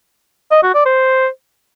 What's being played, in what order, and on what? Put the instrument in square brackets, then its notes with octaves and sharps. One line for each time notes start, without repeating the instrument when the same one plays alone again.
[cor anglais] D#5
F#4
D5
C5